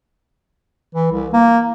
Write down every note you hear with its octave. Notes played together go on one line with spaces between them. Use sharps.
E3
C2
A#3